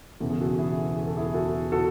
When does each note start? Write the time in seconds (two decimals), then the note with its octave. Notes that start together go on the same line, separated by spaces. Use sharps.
0.20 E1 E2 C#3 E3 A4
0.30 G#4
0.40 F#4 A4
0.58 E4 G#4
0.96 G#4
1.07 A4
1.17 E4 G#4
1.34 F#4 A4
1.72 F#4 A4